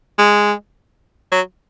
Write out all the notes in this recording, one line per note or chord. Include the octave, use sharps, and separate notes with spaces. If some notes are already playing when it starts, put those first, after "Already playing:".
G#3
F#3